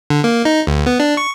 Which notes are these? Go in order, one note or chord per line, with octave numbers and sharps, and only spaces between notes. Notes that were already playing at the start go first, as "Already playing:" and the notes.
D3
A#3
D#4
D2
B3
D4
C#6